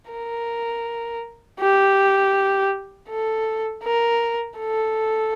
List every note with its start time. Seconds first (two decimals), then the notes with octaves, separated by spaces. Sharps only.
0.11 A#4
1.60 G4
3.09 A4
3.84 A#4
4.59 A4